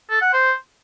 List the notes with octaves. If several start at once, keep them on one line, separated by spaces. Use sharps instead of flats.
A4
F#5
C5